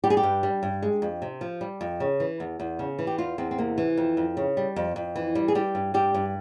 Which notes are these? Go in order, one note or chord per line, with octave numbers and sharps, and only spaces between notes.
G3 G4
G#4
G4
G2
G3
G2
G#3
F2
C3
F3
G3
F2
C#3
E3
E2
E2
C#3
E3
G4
E2 F4
E2 C4
C4
C3 A#3
E3
F2
F2
C#3
G3
F2
F2
E3
G3
G#4
G3 G4
G2
G3 G4
G2